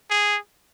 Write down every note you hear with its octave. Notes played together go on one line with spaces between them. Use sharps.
G#4